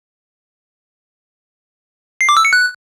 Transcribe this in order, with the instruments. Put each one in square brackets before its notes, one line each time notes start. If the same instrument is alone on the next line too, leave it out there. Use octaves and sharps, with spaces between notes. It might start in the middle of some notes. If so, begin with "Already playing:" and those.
[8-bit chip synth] C7
D6
E6
C#7
F#6